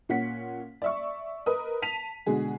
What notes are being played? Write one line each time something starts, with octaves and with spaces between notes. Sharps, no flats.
A#2 C#4 F#5 B6
D5 E5 C#6
A#4 B4 D#5 D#6
A5 B6 D#7 F7
B2 D3 G#3 G#4